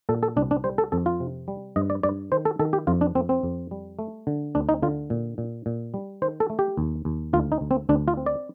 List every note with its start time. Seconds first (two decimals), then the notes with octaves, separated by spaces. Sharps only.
0.09 A#2 A4
0.23 A4
0.36 C2 D4
0.51 D4
0.64 G3 C5
0.78 A4
0.92 F2 A4
1.06 F4
1.20 C3
1.48 G3
1.76 G2 D#5
1.90 D5
2.03 G2 D5
2.32 D#3 C5
2.45 A4
2.59 D#3 A4
2.73 G4
2.87 F2 F4
3.01 D4
3.15 F2 C4
3.29 C4
3.43 F2
3.71 G3
3.99 A3
4.27 D3
4.55 D2 D4
4.69 D#4
4.82 D3 F4
5.10 A#2
5.38 A#2
5.66 A#2
5.94 G3
6.22 D#3 C5
6.40 A4
6.50 A3
6.59 G4
6.77 D#2
7.05 D#2
7.33 D2 F4
7.52 D#4
7.61 D2
7.71 C4
7.89 D2 D4
8.08 F4
8.17 C4
8.26 D5